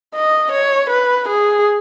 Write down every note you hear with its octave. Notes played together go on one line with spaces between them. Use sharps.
D#5
C#5
B4
G#4